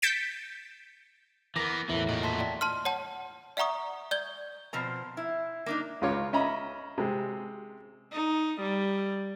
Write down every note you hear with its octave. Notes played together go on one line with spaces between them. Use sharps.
G6 A6 B6 C#7 D7 E7
E3 B3 A#4 D6 A#6
E2 A2 E3 E5
A#2 F#4 D#5
E5 A5 C6 B6
D5 G5
A5 C6 F6
C#5 F#5 A5
D5 E5 F#5 A#5 C#6 D#6
D5 G6 G#6 G7
B2 F3 C4 A#5
E4
A#3 D4 D#4
C#2 C#3 F4 C#5 D6
C#4 D#5 E5 A#5 B5
C3 G#3
D#4
G3